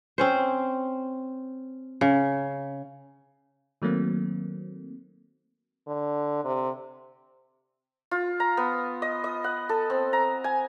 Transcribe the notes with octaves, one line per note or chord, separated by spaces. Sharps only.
C4 C#4 C5
C#3
D#3 F#3 A3 A#3 C4
D3
C3
F4
A#5
B3
D#5
D#5
F#5
A4
C4
A#5
G#5